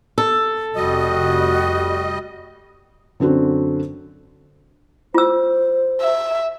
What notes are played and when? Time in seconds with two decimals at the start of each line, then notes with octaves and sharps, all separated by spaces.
0.18 A4
0.76 F1 F2 G3 F#4 D#5
3.20 F#2 D3 C4 F#4
5.14 F4 C5 E6
6.01 E5